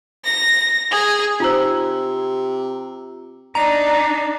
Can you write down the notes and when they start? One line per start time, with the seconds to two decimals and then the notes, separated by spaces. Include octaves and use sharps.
0.24 A#6
0.91 G#4
1.40 C3 D#4 F4 C5 A#5 E6
3.55 D4 D#4 A#5